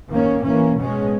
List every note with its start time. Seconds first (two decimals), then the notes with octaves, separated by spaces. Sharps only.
0.10 D#3 A#3 C#4
0.44 E3 A#3 C#4
0.77 B2 G#3 C#4